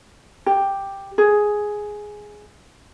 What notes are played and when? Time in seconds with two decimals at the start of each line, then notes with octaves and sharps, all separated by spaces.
0.46 G4
1.18 G#4